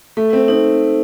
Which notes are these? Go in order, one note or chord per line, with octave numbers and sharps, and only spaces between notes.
A3 A4
C4
C4 D#4